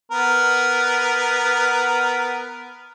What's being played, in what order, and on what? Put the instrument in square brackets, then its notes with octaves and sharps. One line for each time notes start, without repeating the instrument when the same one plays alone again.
[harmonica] B3 A#4